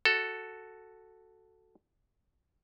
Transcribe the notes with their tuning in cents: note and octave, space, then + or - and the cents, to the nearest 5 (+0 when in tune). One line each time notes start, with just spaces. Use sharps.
F#4 +0 A4 +0